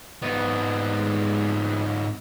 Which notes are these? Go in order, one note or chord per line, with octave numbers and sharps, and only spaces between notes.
G#2 B3